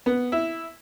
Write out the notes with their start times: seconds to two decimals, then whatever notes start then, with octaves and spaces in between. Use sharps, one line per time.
0.06 B3
0.32 E4